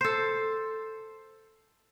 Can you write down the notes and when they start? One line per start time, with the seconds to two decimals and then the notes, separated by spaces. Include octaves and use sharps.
0.01 A4 C5